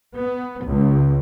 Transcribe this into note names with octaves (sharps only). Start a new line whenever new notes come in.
B3
C#2